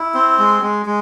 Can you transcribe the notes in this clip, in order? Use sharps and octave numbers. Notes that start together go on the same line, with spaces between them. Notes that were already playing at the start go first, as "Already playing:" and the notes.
Already playing: E4
C4
G#3
G#3
G#3